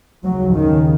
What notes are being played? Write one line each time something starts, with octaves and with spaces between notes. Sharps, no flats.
D#2 C#3 F#3
D#3